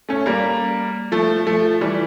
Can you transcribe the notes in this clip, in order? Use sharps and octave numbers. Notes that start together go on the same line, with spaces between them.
A3 C#4
G3 A#3
F3 A3
F3 A3
E3 G3